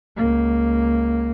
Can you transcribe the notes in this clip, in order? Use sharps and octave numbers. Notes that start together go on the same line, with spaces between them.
C#2 A#3